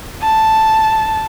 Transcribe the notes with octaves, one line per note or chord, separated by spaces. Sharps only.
A5